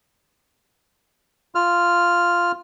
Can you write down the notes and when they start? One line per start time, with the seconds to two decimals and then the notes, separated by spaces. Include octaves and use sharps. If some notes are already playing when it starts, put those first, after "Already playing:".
1.55 F4 F6